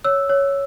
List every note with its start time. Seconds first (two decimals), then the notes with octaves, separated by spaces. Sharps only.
0.04 C#5 E6
0.29 C#5